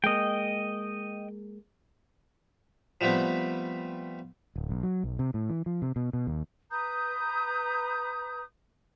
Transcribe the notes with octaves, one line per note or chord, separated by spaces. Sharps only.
G#3 A#3 D#5 G5
F3 G3 A3 B3 C4
D1
B1
F#3
B1
C3
A2
E3
F3
C3
B2
B2
D#2
B4 A#5 D#6 G6